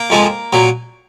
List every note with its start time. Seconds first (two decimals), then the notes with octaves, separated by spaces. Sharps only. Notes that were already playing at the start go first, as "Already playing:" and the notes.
Already playing: A#3
0.10 F2 F3 G#3
0.53 A#2 F#3